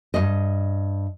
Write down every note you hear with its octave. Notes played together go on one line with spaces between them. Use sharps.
G2 C3 D#5